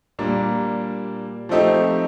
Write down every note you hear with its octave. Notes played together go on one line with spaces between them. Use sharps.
A#2 G3 A#3 D4
F3 A3 C4 D#4 G4